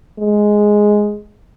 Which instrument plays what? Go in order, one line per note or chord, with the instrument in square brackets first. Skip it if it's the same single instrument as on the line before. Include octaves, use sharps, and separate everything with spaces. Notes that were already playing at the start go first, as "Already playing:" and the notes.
[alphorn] G#3